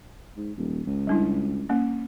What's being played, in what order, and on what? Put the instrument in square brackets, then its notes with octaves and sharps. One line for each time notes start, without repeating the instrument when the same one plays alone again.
[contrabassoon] G#2
D#1
C#2
[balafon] G3 D4 E4
A#3 C#4